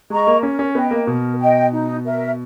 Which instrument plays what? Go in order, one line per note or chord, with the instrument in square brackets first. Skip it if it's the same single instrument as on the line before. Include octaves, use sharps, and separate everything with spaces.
[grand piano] G#3 [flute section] D#5 A#5 C#6
[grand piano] A#3
[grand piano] C#4 [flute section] A#4
[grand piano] C#4
[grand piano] B3 [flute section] D#5 G5
[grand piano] A#3
[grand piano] B2 [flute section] A#4
[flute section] D#5 G5
D#4
A#4 E5